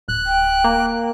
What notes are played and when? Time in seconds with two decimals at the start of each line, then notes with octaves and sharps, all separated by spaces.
0.09 D1 F#6
0.26 G5
0.64 A#3